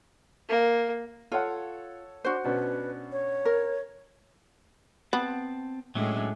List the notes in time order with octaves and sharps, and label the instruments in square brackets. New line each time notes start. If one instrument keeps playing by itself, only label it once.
[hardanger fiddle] A#3
[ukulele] F4 [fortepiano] A4 C#5 F#5
[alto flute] D4 [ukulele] F#4 C5
[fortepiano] B2 C#4 D4 [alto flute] B4
[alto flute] C#5
[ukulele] A#4
[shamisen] B3 [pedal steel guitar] C4 A5
[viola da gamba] A2 G#3 [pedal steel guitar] F#3 C#4 D4